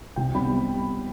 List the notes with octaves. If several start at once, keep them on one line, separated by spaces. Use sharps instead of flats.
C2 G5
C3 G3 B3 B5